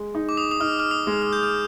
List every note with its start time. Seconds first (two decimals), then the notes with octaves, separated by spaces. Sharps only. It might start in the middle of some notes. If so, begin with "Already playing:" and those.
Already playing: G#3
0.15 D#4
0.29 D6
0.37 D#6
0.51 D#6
0.60 D#4 F6
0.80 F6
0.91 D#6
1.07 G#3
1.22 F6
1.33 G6
1.43 F6